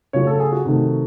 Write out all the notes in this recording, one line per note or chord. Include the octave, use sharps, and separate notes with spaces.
C#3 F#3 A3 C#5
A4
G#4
F#4
C3 D#3 A3